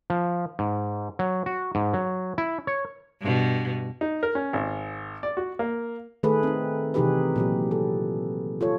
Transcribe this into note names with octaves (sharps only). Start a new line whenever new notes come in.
F3
G#2
F#3
F#4
G#2
F#3
E4
C#5
G2 B2
D#4
A#4
C#4
G#1
D5
F#4
A#3
D#3 A3 G#4 A4 B4
C4 D#4
C3 E3 D#4 G4 G#4 B4
A#2 F#3 G4
A4
F4 A4 C#5